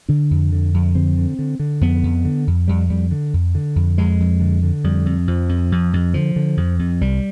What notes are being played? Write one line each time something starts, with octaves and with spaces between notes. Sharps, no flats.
D3 D4
F2
D3
F2
D3 C4
D3
D3
D3
F2 B3
F2
D3
F2
F2 G3
F2 G3
D3
F2
D3
F2
F2 G#3
F2
D3
D3
F2 G3
F2
F2 F3
F2
F2
F2
D3 F3
D3
F2
F2
C2 G3